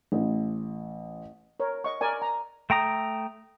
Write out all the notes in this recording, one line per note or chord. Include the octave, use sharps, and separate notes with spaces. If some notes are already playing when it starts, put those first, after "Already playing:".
A1
A#4 C#5
D#5 C#6
A#4 D5 G#5
A#5
A3 G5 A#5 D#6